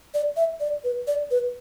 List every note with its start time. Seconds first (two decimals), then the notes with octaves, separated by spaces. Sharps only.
0.14 D5
0.37 E5
0.60 D5
0.84 B4
1.07 D5
1.31 B4